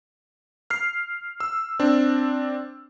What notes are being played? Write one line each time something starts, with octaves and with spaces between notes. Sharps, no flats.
F6 C7
E6
C4 D4